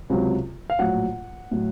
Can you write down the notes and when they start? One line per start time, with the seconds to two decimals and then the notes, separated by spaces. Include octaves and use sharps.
0.10 C#2 C3 F#3
0.70 F5
0.79 A#1 A2 F#3 F#5
1.51 A2 F#3